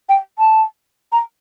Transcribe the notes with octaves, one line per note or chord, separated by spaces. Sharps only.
G5
A5
A#5